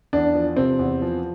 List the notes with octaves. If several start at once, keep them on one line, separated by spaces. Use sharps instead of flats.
E2 D4
F3
C3 C4
E2
F3